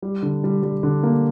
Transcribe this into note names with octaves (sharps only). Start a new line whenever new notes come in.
G3
D3
G3
G3
D3
A#3